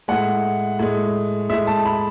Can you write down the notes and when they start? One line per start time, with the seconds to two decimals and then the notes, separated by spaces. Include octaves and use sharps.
0.08 A2 G#3 F#5
0.79 A2 G#3
1.50 G#3 E5
1.53 A2
1.67 A5
1.85 B5